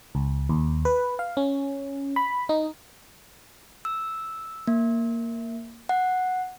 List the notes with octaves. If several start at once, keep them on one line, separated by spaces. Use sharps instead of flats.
C#2
D#2
B4
F5
C#4
B5
D#4
E6
A#3
F#5